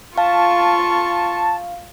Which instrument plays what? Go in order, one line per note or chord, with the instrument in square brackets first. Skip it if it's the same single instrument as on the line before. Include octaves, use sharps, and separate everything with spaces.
[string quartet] F4 C#6 [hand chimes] F5 [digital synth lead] A5